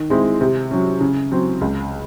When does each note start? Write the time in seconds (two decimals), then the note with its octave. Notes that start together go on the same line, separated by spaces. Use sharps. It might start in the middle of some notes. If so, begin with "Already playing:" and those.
Already playing: D#3
0.10 G#3 C4 E4
0.41 C3
0.71 F#3 C#4
1.01 C#3
1.32 F#3 C4
1.61 C#2